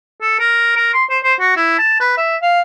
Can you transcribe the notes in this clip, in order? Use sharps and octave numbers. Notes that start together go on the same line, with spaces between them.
A4
A#4
A#4
C6
C5
C5
F#4
E4
A5
B4
E5
F5